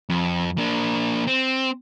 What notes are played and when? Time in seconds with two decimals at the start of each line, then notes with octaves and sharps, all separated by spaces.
0.09 F2
0.58 A#3 D4
1.27 C4